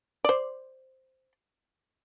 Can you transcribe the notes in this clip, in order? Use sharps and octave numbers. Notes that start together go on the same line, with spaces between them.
C5 D5